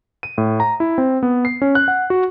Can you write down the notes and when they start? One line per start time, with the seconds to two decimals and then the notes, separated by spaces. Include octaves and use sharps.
0.23 D#7
0.38 A2
0.60 A#5
0.80 E4
0.98 C4
1.23 B3
1.45 C7
1.62 C#4
1.75 F#6
1.88 F#5
2.10 F#4